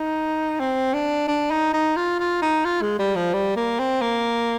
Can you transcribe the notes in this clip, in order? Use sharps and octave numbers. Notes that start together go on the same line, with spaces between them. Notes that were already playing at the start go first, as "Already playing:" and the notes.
Already playing: D#4
C4
D4
D4
D#4
D#4
F4
F4
D#4
F4
G#3
G3
F3
G3
A#3
C4
A#3